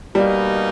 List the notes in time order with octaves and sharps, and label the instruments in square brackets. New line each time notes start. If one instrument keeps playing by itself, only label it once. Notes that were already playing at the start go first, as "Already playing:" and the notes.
[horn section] B2 A#3 D#4 [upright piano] G3